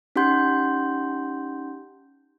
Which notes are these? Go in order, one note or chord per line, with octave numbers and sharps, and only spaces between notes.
C#4 D#4 G4 F#5 C6 G6